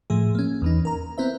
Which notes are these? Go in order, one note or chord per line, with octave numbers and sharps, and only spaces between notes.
A2 F3 A3 G#4
A#3 C#4
E2 E3 D#4
A#4 A#5
B3 C4 E4 C5 E5